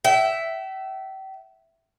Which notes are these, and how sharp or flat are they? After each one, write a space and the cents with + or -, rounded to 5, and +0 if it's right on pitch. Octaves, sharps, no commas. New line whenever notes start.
E5 +0 G5 -40